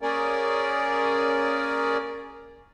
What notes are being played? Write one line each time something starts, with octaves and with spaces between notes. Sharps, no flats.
A#3 C#4 G#4 A#4 D5